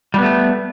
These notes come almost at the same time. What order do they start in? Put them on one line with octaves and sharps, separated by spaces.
G3 B3 A3